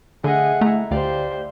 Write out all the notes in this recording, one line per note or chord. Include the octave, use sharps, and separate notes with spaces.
D3 A3 G#4 D#5 F#5
A3 E4 A#5
D2 G4 C5 D5 F5